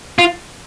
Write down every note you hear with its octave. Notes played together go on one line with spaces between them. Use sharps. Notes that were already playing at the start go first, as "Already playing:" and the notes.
F4